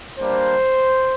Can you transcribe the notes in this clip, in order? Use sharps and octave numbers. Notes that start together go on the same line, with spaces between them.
G3 A#3 D4 C5